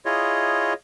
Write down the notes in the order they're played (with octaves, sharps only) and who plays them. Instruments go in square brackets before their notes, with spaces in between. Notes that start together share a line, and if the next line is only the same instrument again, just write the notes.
[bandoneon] E4 F4 G#4 C#5 D#5